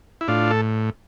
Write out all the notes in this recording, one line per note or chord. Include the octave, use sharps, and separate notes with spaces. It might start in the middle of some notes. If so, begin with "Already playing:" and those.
E4
A2 D4 F4
A4